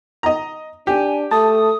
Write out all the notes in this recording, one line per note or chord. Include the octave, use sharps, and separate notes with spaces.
D#5 A#5
D4 G4 G#5
A3 A5 D#6